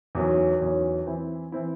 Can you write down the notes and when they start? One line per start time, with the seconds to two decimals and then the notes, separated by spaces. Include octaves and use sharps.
0.15 E2 D#3 F#3 C#4
0.61 E2 D#3 F#3 C#4
1.07 E3 C4 E4
1.52 E3 C4 E4